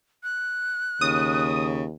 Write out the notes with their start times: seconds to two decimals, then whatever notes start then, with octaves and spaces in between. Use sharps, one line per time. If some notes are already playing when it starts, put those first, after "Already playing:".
0.24 F#6
1.01 D#2 C#3 D#6